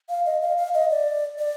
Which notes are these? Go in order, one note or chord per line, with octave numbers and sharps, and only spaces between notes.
F5
D#5
F5
F5
D#5
D5
D5